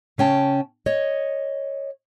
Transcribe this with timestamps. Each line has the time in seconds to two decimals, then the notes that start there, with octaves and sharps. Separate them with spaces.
0.18 C#3 C#4 G5 A5
0.86 C#5 D#5